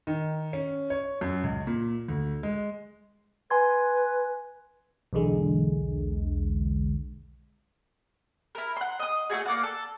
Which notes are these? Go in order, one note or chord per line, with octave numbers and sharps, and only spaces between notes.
D#3
C#4
C#5
F#2
C#2
A#2
D2
G#3
B4 G#5 C6 G#6
B1 E2 D3 G#3
E4 A#4
F#5 C6
D#5 D#6
A3 E4 F#4 G#4
A#3 D5 F#5
A4